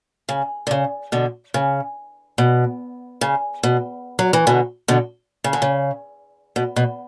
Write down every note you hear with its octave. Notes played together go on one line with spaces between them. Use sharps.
C#3
D3
C#3
B2 D3
C#3
B2
C#3
B2
F#3
E3
B2 D3
B2 D3
C#3
D3
C#3
B2
B2